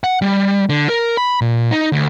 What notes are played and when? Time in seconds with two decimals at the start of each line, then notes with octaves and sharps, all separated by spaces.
0.04 F#5
0.22 G3
0.69 D3
0.89 A#4
1.17 B5
1.41 A#2
1.71 D#4
1.92 D2